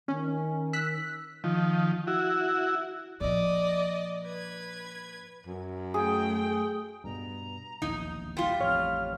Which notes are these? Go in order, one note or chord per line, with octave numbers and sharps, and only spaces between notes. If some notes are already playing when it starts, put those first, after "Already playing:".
D#3 C#4
E6 F#6 B6
D#3 F3
E4 F#4
A#2 F3 D5 D#5
B4 G#6
F#2
A3 G#4 G5
G2 B2 A#5
E1 A#1 D#2 D#4
G3 F4 C6
A1 F2 C#5 F5 F6